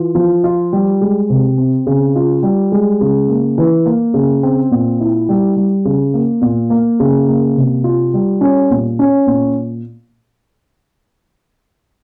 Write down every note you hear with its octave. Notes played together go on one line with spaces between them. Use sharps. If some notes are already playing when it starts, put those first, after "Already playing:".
Already playing: E3 F4
F3
F4
G3
G#3
C3
C4
C#3
F4
G3
G#3
C#3
A#3
E3
A#3
C#3
C4
A#2
E4
G3
G3
C#3
A#3
A#2
A#3
C#3
A#3
C3
F4
G3
C#4
A#2
C#4
A#2